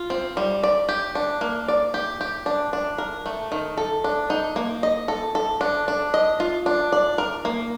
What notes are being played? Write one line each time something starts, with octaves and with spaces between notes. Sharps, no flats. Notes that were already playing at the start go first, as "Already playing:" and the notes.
Already playing: F4
C4
G3
D5
G4
D4
A#3
D5
G4
G4
D4
D4
A#4
A3
D#3
A4
D4
D#4
A#3
D#5
A4
A4
D4
D4
D#5
F4
D4
D5
A#4
A#3